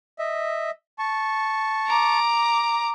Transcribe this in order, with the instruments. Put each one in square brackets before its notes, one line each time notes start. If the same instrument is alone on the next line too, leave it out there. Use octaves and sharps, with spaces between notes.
[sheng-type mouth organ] D#5 E5
A5 C#6
[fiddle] A#5 D6